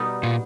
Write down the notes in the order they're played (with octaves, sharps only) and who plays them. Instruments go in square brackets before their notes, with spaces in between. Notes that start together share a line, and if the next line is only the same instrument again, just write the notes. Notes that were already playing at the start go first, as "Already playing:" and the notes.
Already playing: [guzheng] B2 G3 B3 D#4
[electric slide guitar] A#2